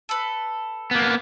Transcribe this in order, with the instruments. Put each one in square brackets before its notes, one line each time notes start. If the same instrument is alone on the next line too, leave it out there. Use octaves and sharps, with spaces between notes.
[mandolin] A4 B4
[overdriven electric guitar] A#3 B3